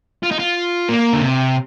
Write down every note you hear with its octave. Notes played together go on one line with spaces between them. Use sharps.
F4
D#4
F4
A#3
D3
C3